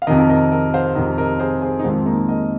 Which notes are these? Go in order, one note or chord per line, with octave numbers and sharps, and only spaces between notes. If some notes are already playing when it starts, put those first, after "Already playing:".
F5
F2 C3 D#3 A#4 D#5
A#4 D#5
A#4 D#5
C5 F5
F2 C3 D#3 A#4 D#5
A#4 D#5
G#4 C5
G#4 C5
D#4
F2 D#3 G#3 C4
A#3 D#4
A#4 D#5